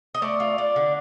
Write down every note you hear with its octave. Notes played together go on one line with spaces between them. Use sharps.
D#5
A3 D5
F4
D4
D3